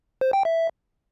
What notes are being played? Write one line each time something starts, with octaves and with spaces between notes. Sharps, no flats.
C5
G5
E5